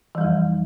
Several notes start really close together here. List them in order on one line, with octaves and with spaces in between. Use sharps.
E3 G3 F3 F2